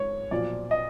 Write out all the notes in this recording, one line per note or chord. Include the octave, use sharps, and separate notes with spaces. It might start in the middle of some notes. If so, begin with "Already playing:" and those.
Already playing: G#2 C#5
B1 A#2 F3 D5
D#5